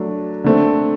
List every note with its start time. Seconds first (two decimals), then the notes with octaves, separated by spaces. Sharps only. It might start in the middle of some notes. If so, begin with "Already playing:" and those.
Already playing: F#3 A3 D4
0.44 D3 A3 C4